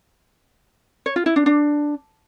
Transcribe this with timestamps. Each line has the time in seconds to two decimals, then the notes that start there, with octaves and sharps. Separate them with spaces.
1.06 C#5
1.16 F4
1.26 E4
1.36 D4
1.46 D4